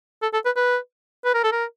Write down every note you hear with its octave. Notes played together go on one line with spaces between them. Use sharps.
A4
A4
B4
B4
B4
A#4
A4
A#4